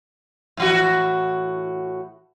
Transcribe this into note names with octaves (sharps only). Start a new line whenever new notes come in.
A2 E3 F#4